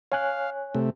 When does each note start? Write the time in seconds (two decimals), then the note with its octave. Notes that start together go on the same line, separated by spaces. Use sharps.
0.12 C#5 F5 G#5 F#6
0.75 C3 A3